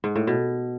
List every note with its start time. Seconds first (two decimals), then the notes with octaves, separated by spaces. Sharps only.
0.04 G#2
0.16 A2
0.27 B2